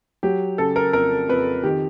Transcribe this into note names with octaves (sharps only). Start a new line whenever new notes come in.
F#3 G4
C#3 A4
A#4
F2 A#4
F2 B4
D#3 G4